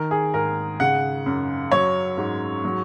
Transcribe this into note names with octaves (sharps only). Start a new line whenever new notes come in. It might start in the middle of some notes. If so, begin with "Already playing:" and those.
Already playing: D#3 A#4
G#4
G#2 A#4
C#3 F#5
F#2
F#3 C#5
G#2
F#3